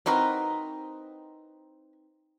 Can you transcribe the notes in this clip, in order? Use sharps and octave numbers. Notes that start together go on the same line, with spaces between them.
C4 D#4 E4 F#4 A#4 B4